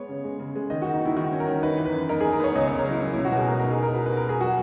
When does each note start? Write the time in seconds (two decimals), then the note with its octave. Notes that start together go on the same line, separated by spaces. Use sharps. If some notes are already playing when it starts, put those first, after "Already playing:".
Already playing: G#3 B3 C#5
0.09 C#3
0.24 G#3
0.39 C#3
0.55 G#3
0.70 D#3 D#5
0.82 F#4
0.86 D#3
0.93 D#4
1.01 D#3 E4
1.17 D#3 F#4
1.32 C#4
1.40 A#4
1.48 D#3
1.63 D#4 B4
1.78 E3
1.86 B4
1.93 F#2
2.09 D#4 A#4
2.21 G#4
2.25 B3
2.32 A#4
2.40 B3 C#5
2.55 C#2 D#5
2.67 C#5
2.71 C#4
2.79 A#4
2.87 F#3 E4
3.02 C#4
3.13 E4
3.18 B2
3.25 F#4
3.32 B2 G#4
3.48 G#3 A#4
3.60 A#4
3.64 D#4
3.71 G#4
3.79 D#4 A#4
3.94 F#4 B4
4.06 B4
4.10 F#4
4.17 A#4
4.25 G#3 G#4
4.41 F#3 F#4